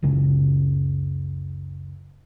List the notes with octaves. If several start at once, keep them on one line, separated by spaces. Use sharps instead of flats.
F#1 C#2 C#3